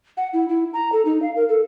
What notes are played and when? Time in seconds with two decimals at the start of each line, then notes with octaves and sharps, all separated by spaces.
0.17 F#5
0.33 E4
0.49 E4
0.73 A#5
0.92 A4
1.05 D#4
1.22 F5
1.36 A#4
1.49 A4